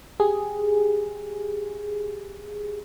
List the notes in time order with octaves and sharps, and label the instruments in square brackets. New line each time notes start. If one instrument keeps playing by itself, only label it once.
[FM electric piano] G4 G#4